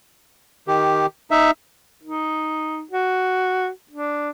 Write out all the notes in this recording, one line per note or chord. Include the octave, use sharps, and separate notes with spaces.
D#3 G4
D#4 E5
D#4
F#4
D4